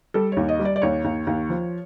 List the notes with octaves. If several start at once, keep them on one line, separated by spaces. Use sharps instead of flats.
G3 A4
D#2 C#5
D#5
G3
D5
D5
D#2 C#5
D#2
D#2
F3